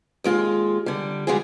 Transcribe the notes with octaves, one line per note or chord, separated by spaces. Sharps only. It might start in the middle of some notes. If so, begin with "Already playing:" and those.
D#2 G#3 F4
D3 G3
G3 G#3 F4 F#4 G#4